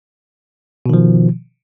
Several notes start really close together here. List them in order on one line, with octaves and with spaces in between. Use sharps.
B2 D#3 F3